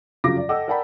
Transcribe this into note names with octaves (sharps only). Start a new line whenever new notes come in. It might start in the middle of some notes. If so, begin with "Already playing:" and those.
F2 C#3 F#3 F4 D6 A#6
D5
A4 D#5 F#5 G5 D6 E6
A#4 D5 F#5 G5 A5 B5